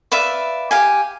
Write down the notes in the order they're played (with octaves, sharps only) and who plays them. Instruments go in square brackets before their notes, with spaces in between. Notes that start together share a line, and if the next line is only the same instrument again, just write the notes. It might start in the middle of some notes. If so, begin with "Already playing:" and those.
[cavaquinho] B4 D5 E5 F5
G4 F5 G#5